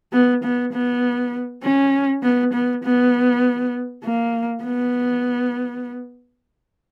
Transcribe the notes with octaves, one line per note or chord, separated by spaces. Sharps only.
B3
B3
B3
C#4
B3
B3
B3
A#3
B3